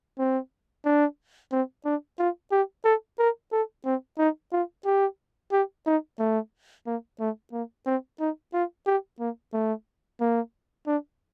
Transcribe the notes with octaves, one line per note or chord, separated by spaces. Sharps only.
C4
D4
C4
D4
F4
G4
A4
A#4
A4
C4
D#4
F4
G4
G4
D#4
A3
A#3
A3
A#3
C4
D#4
F4
G4
A#3
A3
A#3
D4